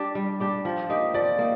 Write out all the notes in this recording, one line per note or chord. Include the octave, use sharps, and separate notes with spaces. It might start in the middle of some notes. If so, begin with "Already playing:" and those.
Already playing: D4 G4 D5
G3
D4 G4 D5
F3
A#3 D#4 G4
F3 D5
A#3 D#4